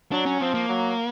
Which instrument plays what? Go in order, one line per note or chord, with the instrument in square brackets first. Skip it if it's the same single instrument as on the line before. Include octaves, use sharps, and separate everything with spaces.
[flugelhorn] F#3 [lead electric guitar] D4
[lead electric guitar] C#4
[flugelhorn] F3 [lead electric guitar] C4
[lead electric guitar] A#3
[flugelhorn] F#3